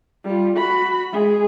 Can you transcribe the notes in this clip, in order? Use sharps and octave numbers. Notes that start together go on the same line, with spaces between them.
G3 F4
F#4 B5
G#3 G#4